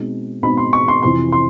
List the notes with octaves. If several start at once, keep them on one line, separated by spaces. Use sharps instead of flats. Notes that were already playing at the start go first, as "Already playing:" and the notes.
Already playing: B2 G#3 C4 D#4
B2 G#3 C4 D#4 B5
C6
C#6
C6
F2 C3 E3 C6
C6